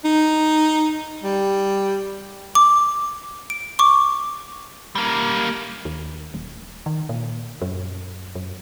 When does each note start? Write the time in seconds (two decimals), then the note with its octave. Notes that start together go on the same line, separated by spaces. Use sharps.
0.04 D#4
1.24 G3
2.55 D6
3.50 D7
3.79 C#6 D6
4.95 G3 A#3
5.85 D#2
6.34 D#1
6.86 D#3
7.09 A#2
7.61 F#2
8.35 F#2